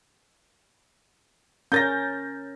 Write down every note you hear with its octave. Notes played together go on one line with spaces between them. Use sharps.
C#4 A#4 G6 A6 A#6